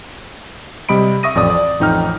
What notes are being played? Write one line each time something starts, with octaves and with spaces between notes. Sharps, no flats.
C3 G3 D#5 B5 D7
E5 C#6 D#6 A#6 D#7
A1 F2 D5 D#6
D5
A1 F2 D#4 G5 F6